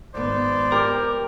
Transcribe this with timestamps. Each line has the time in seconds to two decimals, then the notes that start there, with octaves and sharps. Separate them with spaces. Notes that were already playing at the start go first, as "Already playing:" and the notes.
0.15 G#1 B3 C5 D5
0.72 G4 A#4